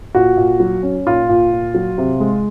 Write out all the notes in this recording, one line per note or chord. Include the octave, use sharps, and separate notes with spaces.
A#2 F#4
A#2
F#3
C#4
A#2 F4
A#2
A#2
F#3
C3
G#3